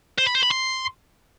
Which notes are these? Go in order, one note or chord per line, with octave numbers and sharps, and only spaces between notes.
C5
B5
C5
B5
C6